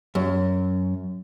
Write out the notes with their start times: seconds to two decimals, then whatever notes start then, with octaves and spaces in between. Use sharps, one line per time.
0.15 F#2